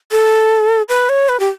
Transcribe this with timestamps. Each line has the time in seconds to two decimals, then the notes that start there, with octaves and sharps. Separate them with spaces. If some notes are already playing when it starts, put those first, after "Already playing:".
0.12 A4
0.89 B4
1.09 C#5
1.29 B4
1.40 G4